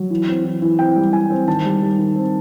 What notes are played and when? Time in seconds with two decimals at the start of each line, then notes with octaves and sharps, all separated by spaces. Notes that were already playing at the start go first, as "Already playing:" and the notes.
Already playing: F#3
0.10 E3
0.28 C4
0.44 E3
0.62 E3
0.79 C4 G5
0.96 G3
1.13 E3 G#5
1.30 C4
1.47 D#3 A5
1.65 G3
1.81 G3
1.98 D#3
2.16 C4